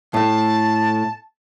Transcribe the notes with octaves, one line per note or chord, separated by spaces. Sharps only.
A2 A3 A5